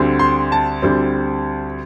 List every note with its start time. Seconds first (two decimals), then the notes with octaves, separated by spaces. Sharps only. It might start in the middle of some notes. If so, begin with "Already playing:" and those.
Already playing: D2 D3 G3 C4
0.19 C6
0.52 A5
0.82 D2 D3 G3 C4